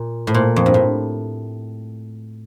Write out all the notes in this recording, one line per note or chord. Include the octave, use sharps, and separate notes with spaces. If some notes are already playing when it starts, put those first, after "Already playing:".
Already playing: A#2
A2
A#2
F2
G2
A2